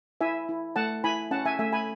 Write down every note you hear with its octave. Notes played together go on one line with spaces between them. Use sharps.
E4 E5 G#5
E4
A3 F#5 A5
E4 G#5 B5
C#4 F#5 A5
E5 G#5
A3 E5 G#5
G#5 B5